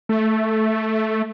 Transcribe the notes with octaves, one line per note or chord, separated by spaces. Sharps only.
A3